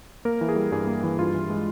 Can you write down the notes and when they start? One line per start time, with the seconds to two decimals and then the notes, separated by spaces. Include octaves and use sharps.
0.25 A#3 A#4
0.41 E3
0.49 G#4
0.56 G3
0.72 G2 G#4
0.87 A#3
1.03 E3
1.19 G2 F4
1.34 E3
1.50 G#3